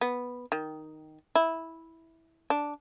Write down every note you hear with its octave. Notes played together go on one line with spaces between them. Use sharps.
B3
D#3
E4
D4